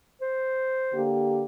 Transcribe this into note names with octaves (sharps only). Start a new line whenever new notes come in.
C5
D3 A#3 G4